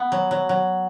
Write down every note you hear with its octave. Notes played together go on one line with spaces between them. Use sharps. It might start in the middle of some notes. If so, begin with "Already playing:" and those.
Already playing: B3
F#3
F#3
F#3